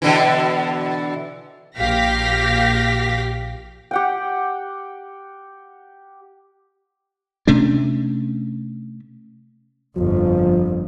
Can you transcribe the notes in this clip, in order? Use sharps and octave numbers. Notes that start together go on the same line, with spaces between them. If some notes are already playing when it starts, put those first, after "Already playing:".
B2 D3 E3
A#1 G4 F5 A#6 B6
G4 F#5 G5
C3 A3 C#4 D4
G1 F2 F3